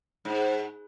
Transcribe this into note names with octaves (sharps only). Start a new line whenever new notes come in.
G#2